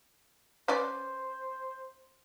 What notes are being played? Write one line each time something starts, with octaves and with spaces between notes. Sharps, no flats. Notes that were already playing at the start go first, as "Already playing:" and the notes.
C#4 B4 C5 D5